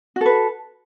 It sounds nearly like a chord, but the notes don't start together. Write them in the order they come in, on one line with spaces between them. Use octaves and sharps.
F#4 A4 B4